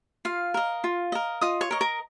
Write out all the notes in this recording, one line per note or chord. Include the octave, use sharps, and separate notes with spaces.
F4 F5
A#4 D#5
F4
A#4 D#5
F4 D#5 D#6
C#5 C#6
A#4 D#5
A#4 A#5